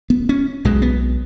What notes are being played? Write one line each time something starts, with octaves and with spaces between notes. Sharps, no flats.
B3
C#4
B1 B2 G#3
B3